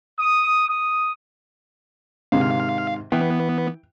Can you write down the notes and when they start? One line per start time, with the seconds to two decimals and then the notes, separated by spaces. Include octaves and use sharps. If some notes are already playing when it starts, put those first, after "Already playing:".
0.19 D#6
0.69 D#6
2.32 G#2 C3 D#3 F5
3.12 E3 B3 G5